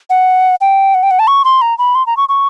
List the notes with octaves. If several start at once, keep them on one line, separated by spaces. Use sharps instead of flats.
F#5
G5
F#5
G5
F#5
A5
C#6
C6
A#5
B5
C6
A#5
C#6
C#6